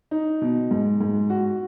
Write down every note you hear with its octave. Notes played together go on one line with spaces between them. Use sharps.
D#4
B2
G#2
G#2
F#4